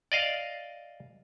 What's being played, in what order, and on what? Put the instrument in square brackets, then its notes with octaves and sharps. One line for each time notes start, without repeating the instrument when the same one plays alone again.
[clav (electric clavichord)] D5 D#5 F5